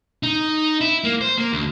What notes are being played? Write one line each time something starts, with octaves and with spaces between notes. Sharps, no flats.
D#4
E4
A#3
C5
A#3
D2